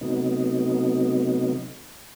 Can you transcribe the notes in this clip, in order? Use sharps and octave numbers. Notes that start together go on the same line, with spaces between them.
C3 F#3 A3 B3 D#4